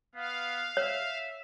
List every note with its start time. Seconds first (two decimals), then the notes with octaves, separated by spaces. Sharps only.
0.15 B3 F5
0.77 C#5 E5